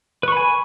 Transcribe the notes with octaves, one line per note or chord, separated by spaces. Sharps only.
B4 G#5 B5 C#6